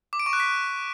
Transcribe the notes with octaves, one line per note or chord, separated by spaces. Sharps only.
D6
D7
C#6
F#6
B6